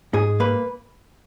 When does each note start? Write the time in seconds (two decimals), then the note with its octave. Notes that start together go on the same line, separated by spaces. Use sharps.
0.14 G#2 G#4
0.40 A#3 B4